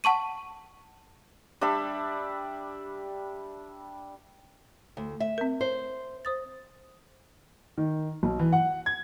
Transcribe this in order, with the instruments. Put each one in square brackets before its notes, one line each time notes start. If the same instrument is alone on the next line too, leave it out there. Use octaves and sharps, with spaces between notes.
[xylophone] F#5 A5 C#6 D#7
[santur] G3 D4 E5 B5
[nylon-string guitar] D2
E5
[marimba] C4 A#4
[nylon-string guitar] C5
[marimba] C5 D#6 A6
[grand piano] D#3
B1
E3
F#5
G#6